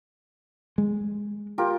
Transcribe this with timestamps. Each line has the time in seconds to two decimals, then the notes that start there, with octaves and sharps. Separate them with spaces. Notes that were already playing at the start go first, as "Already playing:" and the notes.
0.78 G#3
1.58 F4 G4 A#4